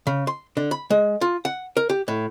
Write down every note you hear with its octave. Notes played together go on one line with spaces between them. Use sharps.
C#3
C6
D3
B5
G#3
F4
F#5
A#4
G4
A2